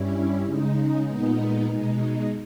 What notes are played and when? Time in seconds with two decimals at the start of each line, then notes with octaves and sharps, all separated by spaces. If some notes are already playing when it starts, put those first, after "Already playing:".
Already playing: G2 G3 C#4 E4
0.45 C#3 G#3 D#4
1.06 A#2 G#3 B3 D#4
1.68 B2 G#3 D#4